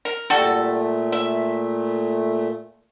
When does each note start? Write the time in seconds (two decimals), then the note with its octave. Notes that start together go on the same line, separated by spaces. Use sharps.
0.05 A#4
0.30 A#2 G3 A3 F#4 A4
1.12 E5